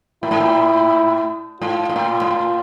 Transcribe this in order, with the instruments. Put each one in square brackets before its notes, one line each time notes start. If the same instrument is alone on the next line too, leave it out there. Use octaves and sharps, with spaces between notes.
[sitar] A2 [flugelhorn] E4
[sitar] G#2
A2
[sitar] G#2 [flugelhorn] F4
[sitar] G#2
A2
G#2
A2